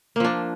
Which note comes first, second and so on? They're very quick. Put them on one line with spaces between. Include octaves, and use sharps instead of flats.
A#3 F3 D4